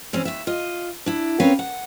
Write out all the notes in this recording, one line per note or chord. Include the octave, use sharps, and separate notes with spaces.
E3 C4 C#4
D#2 E5
F4 D#5
D4 E4
C4 C#4 A#4 B4 C#5 F5
F#5